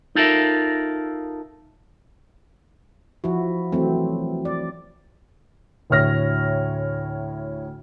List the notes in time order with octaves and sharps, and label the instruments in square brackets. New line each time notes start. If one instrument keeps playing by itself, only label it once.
[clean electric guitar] D#4 F4 A4 A#4 E5
[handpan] F3 E4 F#4
E3 F#3 A3 C4
D5
[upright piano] D2 A2 C#5 F6 A#6